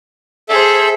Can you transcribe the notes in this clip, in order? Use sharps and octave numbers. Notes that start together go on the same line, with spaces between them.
G#4 A4 C5 E5